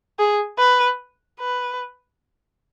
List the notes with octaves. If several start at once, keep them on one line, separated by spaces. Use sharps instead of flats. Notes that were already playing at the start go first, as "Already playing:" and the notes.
G#4
B4
B4